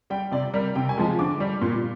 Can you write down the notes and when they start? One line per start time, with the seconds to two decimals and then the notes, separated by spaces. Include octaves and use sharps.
0.10 G3 G5
0.32 C3 D5
0.54 G3 A#4
0.75 C3 G5
0.89 G#5
0.98 F3 G#3
1.19 D3 D6
1.40 G3
1.61 A#2